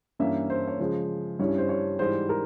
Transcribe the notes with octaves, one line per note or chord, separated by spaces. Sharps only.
G2 E3 A#3 C#4 E4 E5
C5
C#5
C#3 F3 G#3 C5
G2 G3 C#4 E4 C#5
C5
C#5
G#2 E3 G3 C5
A#4